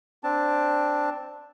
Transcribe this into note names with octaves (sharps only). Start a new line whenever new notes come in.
C4 D4 A5